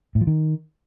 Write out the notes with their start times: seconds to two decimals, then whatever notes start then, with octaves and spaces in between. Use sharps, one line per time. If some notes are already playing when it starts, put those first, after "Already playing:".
0.15 A2
0.21 F3
0.27 D#3